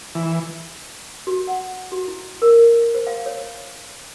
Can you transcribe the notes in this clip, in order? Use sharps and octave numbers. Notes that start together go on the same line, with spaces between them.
E3
F#4
F#5
F#4
E4
A#4
C5
F5
C#5